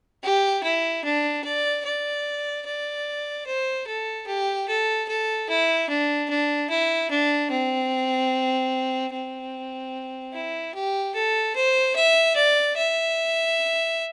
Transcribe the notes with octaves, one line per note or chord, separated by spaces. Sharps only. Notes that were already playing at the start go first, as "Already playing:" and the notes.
G4
E4
D4
D5
D5
D5
C5
A4
G4
A4
A4
E4
D4
D4
E4
D4
C4
C4
E4
G4
A4
C5
E5
D5
E5